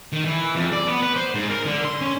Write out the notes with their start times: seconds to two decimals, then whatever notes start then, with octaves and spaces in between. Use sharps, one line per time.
0.13 D#3
0.26 E3
0.55 F2
0.73 D5
0.88 B3
1.02 B4
1.16 C5
1.35 G#2
1.49 A#4
1.66 D3
1.85 C6
2.01 C#4